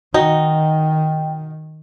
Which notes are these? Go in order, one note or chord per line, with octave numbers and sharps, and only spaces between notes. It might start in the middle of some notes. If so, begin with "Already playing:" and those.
D#3 D#4 F#4 G5